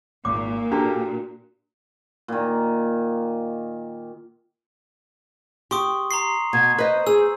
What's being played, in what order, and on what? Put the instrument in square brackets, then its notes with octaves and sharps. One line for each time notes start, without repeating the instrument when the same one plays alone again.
[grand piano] G#1 [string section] A#2 [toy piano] D6
[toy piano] D4 A#5 [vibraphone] F#4 [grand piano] G4 A4 A#4
[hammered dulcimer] A#2 D#3
[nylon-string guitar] G4 [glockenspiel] C6 C#6 D#6
[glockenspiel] A#5 C6 C7
[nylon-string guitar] B2 [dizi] G#6
[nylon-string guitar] B4 D#5 [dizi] C5
[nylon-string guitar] G#4 [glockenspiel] E6